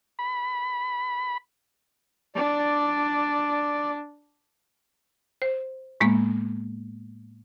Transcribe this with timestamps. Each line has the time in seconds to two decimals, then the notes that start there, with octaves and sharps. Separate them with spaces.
0.19 B5
2.35 D4 D5
5.42 C5
6.01 A2 G#3 A#3 B3